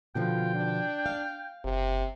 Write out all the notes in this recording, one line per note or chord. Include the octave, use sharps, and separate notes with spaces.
B2 D3 F3 F4 G5
D4
F5
F#1 C3